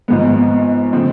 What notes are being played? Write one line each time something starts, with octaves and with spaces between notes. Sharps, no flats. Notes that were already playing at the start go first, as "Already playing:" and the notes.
G#1 G#2 F3 G#3 B3
C#3 F3 A3 C4